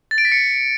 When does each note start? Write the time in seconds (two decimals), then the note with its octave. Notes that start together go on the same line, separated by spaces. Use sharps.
0.11 A6
0.18 D7
0.25 B6
0.32 C#7